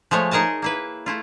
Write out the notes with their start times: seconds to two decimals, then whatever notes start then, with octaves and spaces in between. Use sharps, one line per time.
0.11 F3 G#3 A3 C#5
0.31 D#4 G#4 A#4 D#5 A5
0.62 A#3 E4 B4
1.06 A3 E4 F4